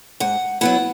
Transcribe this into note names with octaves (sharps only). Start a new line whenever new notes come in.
G#2 F#5
F#3 B3 E4 F#5